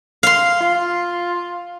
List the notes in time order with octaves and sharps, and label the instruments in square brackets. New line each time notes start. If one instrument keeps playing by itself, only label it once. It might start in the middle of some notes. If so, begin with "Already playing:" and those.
[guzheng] F5 C6
[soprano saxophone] F4